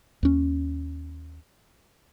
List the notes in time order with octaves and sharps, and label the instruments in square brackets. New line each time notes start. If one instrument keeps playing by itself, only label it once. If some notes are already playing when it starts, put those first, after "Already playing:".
[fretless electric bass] D#2 C#4